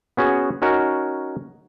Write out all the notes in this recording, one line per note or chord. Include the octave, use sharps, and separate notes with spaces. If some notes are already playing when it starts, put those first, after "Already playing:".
B3 C#4 F#4 G#4
C#4 D#4 F#4 A#4